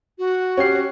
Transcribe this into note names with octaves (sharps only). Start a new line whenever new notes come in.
F#4
C#4 G4 C7